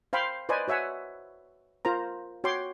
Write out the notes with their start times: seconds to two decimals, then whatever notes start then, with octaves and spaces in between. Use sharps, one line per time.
0.13 C5 F5 G5 B5 C6
0.49 B4 C5 D5 D#5 G#5
0.68 F#4 C#5 E5 F#5 G#5
1.85 F4 A#4 C5 A#5
2.44 F#4 C#5 G5 C6 D6